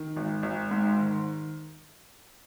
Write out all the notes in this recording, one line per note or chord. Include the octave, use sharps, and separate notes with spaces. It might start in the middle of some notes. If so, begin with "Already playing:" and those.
Already playing: D#3
G#1
G#1
G#2
D#3